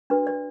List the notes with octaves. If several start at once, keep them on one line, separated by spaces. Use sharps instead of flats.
D4 F#4 B4
D5